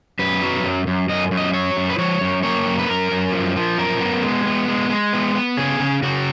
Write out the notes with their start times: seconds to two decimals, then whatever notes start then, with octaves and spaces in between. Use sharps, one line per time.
0.19 F#2 B4
0.42 F#3
0.64 F#2
0.87 F#2
1.09 F#2 D#5
1.31 F#2
1.37 D#5
1.53 F#3 C#5
1.77 F#2
1.90 B4
1.98 F3 C#5
2.21 F#2
2.43 A#3 C#5
2.66 F#2
2.79 B4
2.89 F#2 A#4
3.11 F#2
3.33 F3
3.56 F3
3.78 F#2 A#4
4.00 B3
4.23 G#3
4.46 B3
4.68 G#3
4.90 G#3
5.13 B3
5.35 B3
5.57 C#3 G#4
5.80 C#3
6.03 C#3 F#4